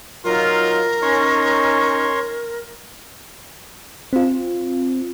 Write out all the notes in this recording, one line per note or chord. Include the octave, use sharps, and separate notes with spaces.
F#3 D#4 F4 A#4
C#4 D#4 C#5 C6 C#6
C4 F4